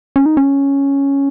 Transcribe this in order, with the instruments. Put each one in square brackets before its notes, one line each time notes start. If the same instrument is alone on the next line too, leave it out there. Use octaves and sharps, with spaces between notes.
[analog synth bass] C#4
D#4
C#4